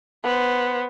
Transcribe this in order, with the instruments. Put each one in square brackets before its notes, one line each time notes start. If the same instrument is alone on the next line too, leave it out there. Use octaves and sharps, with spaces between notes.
[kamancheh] B3 C5